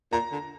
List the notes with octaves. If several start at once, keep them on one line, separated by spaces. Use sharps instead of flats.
A#2 A#5
D3